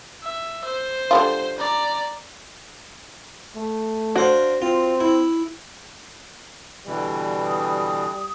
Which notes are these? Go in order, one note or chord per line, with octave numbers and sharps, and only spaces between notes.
E5
C5
D3 G3 F4
D5 A#5
A3
D4 F#4 C5 F5
C4 F4
E4
B2 D3 E3 G3
D#6